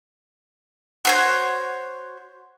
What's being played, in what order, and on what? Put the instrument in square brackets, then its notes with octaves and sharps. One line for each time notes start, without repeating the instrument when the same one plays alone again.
[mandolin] F#4 C5 C#5